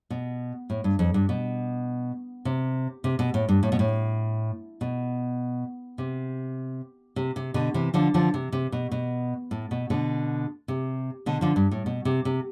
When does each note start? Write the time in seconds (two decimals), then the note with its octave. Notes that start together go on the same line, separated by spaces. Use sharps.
0.10 B2
0.70 A2
0.84 G2
0.99 F2
1.14 G2
1.29 B2
2.45 C3
3.04 C3
3.19 B2
3.34 A2
3.49 G2
3.63 A2
3.72 B2
3.79 A2
4.81 B2
5.98 C3
7.16 C3
7.36 C3
7.54 B2 D3
7.74 C3 E3
7.94 D3 F3
8.14 D3 F3
8.34 C3
8.52 C3
8.72 B2
8.92 B2
9.51 A2
9.71 B2
9.90 B2 D3
10.68 C3
11.26 B2 D3
11.41 D3 F3
11.56 G2
11.71 A2
11.86 B2
12.05 C3
12.25 C3